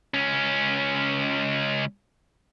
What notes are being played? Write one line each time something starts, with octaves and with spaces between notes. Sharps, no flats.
C#2 C#4